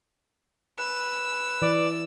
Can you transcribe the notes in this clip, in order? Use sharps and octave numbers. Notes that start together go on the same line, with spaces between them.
B4 E6
E3 D5